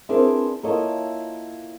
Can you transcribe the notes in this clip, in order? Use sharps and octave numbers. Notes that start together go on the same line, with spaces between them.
C4 D4 E4 G#4 A#4 B4
A#3 E4 F4 A4 C#5 D#5